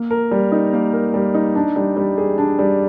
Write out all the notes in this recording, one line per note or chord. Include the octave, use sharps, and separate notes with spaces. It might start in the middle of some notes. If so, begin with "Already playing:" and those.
Already playing: A#3
A#4
G3
D#4
A#3
A#4
G3
D#4
D4
G3
G3
G#4
D4
G3